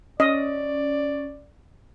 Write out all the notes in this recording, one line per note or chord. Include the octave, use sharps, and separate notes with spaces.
C#4 D5 D#5